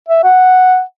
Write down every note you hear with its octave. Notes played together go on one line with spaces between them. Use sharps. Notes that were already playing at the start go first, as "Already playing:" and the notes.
E5
F#5